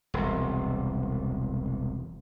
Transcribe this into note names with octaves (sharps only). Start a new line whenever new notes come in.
E1 C2